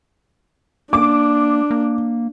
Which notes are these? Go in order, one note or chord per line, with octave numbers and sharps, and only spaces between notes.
A#3 D4 D6
A#3